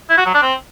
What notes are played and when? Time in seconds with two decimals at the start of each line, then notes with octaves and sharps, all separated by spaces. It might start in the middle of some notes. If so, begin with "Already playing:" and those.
0.10 E4
0.18 F#4
0.26 F#3
0.34 D4
0.42 C4